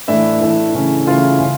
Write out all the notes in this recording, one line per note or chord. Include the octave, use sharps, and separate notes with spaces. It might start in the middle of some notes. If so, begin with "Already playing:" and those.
A2 E3 A3 D4 E4 E5
A2 E3 A3 D4
C#3 E3 A3 C#4
C#3 E3 A3 C#4 F4 F5
C#3